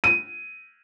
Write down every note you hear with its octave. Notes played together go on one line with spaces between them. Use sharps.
D#7